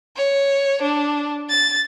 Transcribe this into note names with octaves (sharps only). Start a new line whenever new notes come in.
C#5
D4
A6